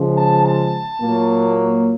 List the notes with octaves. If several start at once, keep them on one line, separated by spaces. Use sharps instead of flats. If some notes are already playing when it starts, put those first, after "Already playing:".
Already playing: C#3 F3 G#3
A5
A5
A#2 F#3 A#3